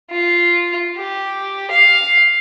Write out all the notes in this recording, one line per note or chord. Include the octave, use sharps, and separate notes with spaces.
F4
G4
F5